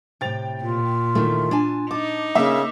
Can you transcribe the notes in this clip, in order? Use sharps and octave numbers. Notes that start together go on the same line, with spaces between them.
A2 C3 G5 A6 F7
A#2 F4
D#2 D#3 E3 A3
D4 G#5 A5
D#4 A5 D6
C#3 A#3 E5 D6 E6